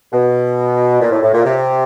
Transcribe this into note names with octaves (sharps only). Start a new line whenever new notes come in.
B2
A#2
A2
A2
A#2
C3